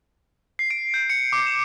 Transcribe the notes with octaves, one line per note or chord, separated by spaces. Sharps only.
C7
D7
G6
C#7
D6
E7